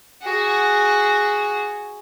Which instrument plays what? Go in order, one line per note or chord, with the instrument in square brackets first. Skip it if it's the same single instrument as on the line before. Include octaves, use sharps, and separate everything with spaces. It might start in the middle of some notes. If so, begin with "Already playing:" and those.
[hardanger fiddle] F#4 G#4